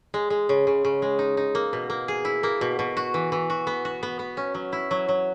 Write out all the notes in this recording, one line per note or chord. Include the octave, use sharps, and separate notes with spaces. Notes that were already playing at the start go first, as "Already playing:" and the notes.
G#3
G#3
C#3
C#3
C#3
G#3
D#4
D#4
A#3
B2
A#3
G#4
E4
A#3
B2
B2
F#4
E3
E3
F#4
B3
F#4
B3
B3
C#4
F#3
E4
F#3
F#3